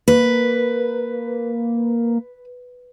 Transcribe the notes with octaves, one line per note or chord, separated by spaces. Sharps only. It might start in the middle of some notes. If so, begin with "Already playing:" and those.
A#3 B4